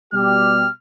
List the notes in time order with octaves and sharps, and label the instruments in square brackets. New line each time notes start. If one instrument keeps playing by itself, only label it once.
[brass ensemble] B2 G3 G4 [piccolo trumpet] F6